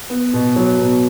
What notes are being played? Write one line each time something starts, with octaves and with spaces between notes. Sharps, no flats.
B3
B2
F#3
B2